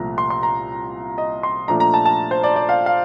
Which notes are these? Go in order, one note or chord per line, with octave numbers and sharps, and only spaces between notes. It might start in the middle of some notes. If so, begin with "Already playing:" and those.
Already playing: C2 A#2 F3 A3 A#5
C6
C6
A#5
D#5
C6
A#2 F3 A3 D4 A#5
A#5
A5
A5
C5
D5
D5
F5
F5